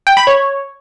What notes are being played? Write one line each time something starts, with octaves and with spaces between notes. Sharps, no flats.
G5
B5
C#5